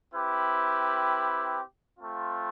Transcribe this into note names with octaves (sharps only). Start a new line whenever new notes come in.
C4 E4 G4 B4
A3 C4 F4